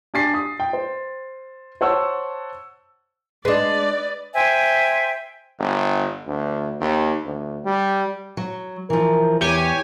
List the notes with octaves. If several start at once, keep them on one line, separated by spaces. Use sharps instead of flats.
D4 G4 G#5 A6 B6 C7
D#6
G5
C5
C5 C#5 F#5 A5 C#6 E6
G#3 D4 B4 D5 D#5
C5 E5 G5 G#5
G1
D2
D#2
D2
G3
F#3
E3 F3 A#4
E2 E3 G4 C#5 G#5